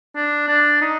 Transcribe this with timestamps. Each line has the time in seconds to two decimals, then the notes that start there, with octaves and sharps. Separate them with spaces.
0.16 D4
0.48 D4
0.81 D#4